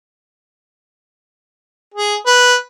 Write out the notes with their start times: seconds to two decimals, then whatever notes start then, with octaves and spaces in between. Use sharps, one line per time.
1.94 G#4
2.26 B4